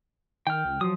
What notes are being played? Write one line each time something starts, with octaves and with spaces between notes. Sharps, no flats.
D#3 G5 F6
C#2
F3 F#3 D#6